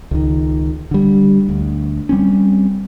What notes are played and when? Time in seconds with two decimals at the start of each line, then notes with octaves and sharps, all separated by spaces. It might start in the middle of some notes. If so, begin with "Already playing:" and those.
0.11 C#2 D#3
0.91 D3 G3
1.49 D2
2.09 G3 C4 C#4